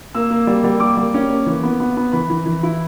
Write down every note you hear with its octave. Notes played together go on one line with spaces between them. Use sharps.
A#3 E6
A#3
G3
G3
A#3 D6
G3
C#4
A#3
E3
B3
B3
B3
E3 B5
E3
E3
E4